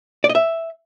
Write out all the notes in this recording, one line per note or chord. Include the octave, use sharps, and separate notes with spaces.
D5
D#5
E5